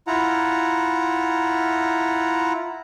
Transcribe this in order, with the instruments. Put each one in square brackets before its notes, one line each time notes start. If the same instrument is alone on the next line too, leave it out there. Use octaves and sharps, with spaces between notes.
[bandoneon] E4 F4 F#5 A#5